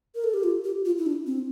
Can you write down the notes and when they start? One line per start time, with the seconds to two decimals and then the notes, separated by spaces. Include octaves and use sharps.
0.15 A#4
0.24 A4
0.34 G4
0.44 F4
0.64 G4
0.85 F4
0.98 E4
1.06 D4
1.27 C4